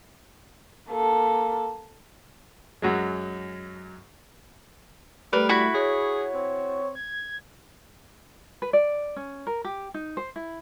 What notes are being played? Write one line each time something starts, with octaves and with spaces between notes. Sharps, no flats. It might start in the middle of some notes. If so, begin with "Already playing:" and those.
A#3 A4
F#2 F#3 G#3
G3 A3 A#4 B4
E4 F#4 B5
G#4 C#5
C4
G#6
B4
D5
C#4
A#4
G4
D#4
C5
E4